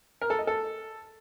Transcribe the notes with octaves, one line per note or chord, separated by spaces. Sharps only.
A#4
A4
D#5
A4